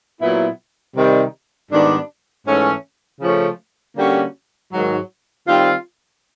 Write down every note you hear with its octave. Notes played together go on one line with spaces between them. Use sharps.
A#2 F#3 B3 E4
C3 D#3 G3
G#2 D#3 G3 B3 D4
G#2 E3 A3 C#4
C#3 F3 A3 C#4
D3 G3 A#3 C#4 F#4
G#2 D#3 F#3
D#3 G3 C4 F4